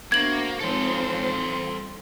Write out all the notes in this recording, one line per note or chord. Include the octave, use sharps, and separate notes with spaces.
A#3 B3 D4 F#4 C5 E5 G#6 F#7
F3 G#3 C4 D#4 F4 A4 C5 C#5
G3 C6